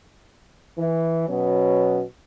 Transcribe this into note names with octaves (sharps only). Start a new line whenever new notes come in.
E3
B2 F#3 B3 C#4